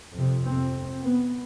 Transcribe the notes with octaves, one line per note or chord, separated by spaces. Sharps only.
F2 C3
C4
B3